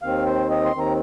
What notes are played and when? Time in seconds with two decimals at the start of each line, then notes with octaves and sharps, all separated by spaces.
0.02 D#2 D#3 C4 F5
0.26 C5
0.50 D#5
0.65 C6
0.75 D#2 D#3 C4 A#5